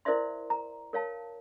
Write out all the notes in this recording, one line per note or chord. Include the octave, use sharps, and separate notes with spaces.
E4 A#4 C5 D5 E5 C6
A#5
A#4 C#5 F5 A5